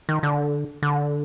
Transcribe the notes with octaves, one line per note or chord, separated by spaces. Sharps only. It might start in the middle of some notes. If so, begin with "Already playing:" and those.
D#3
D3
D3